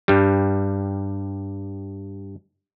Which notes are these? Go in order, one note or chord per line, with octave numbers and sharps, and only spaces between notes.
G2 G3